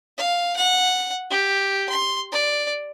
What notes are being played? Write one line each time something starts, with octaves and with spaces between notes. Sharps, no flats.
F5
F#5
G4
C6
D5